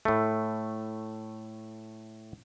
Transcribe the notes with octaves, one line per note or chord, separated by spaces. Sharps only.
A2 A3